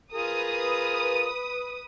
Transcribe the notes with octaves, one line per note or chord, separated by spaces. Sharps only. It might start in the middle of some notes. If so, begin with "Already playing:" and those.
F4 G#4 A#4 B4 D#6